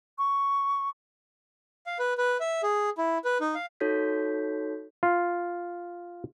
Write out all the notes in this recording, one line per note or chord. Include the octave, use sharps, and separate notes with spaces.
C#6
F5
B4
B4
E5
G#4
E4
B4
D#4
F5
D#4 F#4 A4 C#5 G6 B6
F4